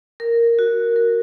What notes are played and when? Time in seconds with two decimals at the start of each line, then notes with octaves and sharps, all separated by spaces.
0.20 A#4
0.59 F#4
0.96 A#4